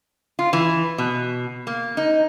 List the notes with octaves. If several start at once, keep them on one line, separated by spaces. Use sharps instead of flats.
F4
E3
B2
A#3
D#4